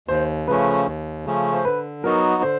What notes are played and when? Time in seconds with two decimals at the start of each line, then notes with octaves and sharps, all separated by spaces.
0.08 D#2 C5
0.48 C#3 F3 A3 C#4 B4
0.87 D#2
1.25 C#3 F3 A3 C#4
1.54 C5
1.65 D3 B4
2.03 F#3 B3 D#4 F#4 A#4
2.43 D3 C5